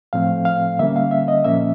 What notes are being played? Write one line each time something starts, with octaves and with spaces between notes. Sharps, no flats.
A2 F3 A3 C4 F5
F5
D3 G3 A#3 C#4 E5
F5
E5
D#5
A#2 F3 A#3 C#4 E5